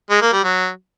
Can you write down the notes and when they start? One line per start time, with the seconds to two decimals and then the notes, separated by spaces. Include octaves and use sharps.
0.10 G#3
0.21 A#3
0.33 G3
0.44 F#3